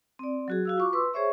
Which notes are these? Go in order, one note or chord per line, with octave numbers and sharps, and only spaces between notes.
C4 D5
F#3 F#4 G#4
F#4 F5 E6
F4 C#6 D6
B4 C6 E6
G#4 C5 C#5 E5 C#6